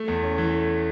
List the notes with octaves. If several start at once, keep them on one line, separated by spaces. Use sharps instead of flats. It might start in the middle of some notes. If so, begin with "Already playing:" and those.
Already playing: A3
E2
C#4
E3
A3